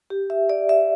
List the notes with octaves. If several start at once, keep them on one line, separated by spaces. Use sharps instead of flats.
G4
E5
D5
E5